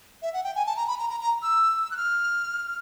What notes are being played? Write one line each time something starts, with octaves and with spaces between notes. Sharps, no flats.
E5
F#5
G5
G#5
A5
A#5
B5
A#5
A#5
A#5
E6
F#6
F6